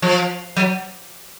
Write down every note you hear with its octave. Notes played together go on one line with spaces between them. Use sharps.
F3
F#3